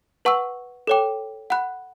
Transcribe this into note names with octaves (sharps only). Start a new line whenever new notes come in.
B4 F#5 A5 C#6 E6
A4 C#5 G5 D6
F#5 B5 F#6